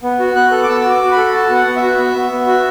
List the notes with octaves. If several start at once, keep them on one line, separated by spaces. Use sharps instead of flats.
B3
F#4
B3 F#6
A4
D6
B3 E6
F#4 E6
D6
F#4
B5
A4
F#4 A5
B3
F#5
B3
E5
F#4
B3
B3
B3
F#4